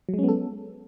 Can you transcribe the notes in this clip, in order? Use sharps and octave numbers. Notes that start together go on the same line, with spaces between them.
F#3 G#3 B3 C#4 A4